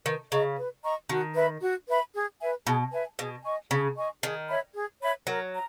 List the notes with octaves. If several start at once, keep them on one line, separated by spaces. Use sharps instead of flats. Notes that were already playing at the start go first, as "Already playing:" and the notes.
D#3 B4
C#3 D#5 A#5 C#6
B4
D#5 A#5 C#6
D#3 F#4
B4 E5 B5
F#4
B4 E5 B5
G#4
B4 E5 G#5
B2 G#4
B4 E5 G#5
B2 G#4
D#5 G#5 C#6
C#3 G#4
D#5 G#5 C#6
D#3 G#4
C#5 E5 B5
G#4
C#5 E5 B5
F#3 A#4
A#5